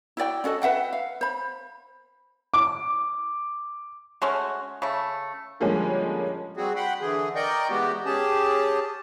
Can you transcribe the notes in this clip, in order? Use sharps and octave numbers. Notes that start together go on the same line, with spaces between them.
E4 F#4 D5 G5
C#4 F#4 A4 D#5
B4 E5 F#5 G5
F5
C5 B5
D6
G#3 A3 C#4 F#4
C#3 A3
D3 F3 G3 G#3 A#3 C#4
G3 C4 F#4 G#4
F#5 G5 B5 C6
D3 E3 G#4
A#4 D5 D#5 G5 C#6 G6
E3 G#3 B3 F#4 G4
C#4 G4 G#4 A5